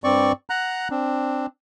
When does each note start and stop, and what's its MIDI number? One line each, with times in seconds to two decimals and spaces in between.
0.04 0.32 43
0.04 0.32 60
0.04 0.32 74
0.04 0.32 85
0.50 0.88 78
0.50 0.88 82
0.50 0.88 90
0.91 1.46 60
0.91 1.46 62